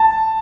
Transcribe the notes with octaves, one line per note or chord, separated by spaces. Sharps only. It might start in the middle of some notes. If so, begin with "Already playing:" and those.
Already playing: A5